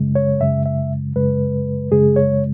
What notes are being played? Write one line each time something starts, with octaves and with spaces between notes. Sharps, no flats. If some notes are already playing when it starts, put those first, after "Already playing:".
Already playing: F#2 C#3 G#3
C#5
F#2 C#3 G#3 E5
E5
F#2 C#3 G#3 B4
F#2 C#3 G#3 G#4
C#5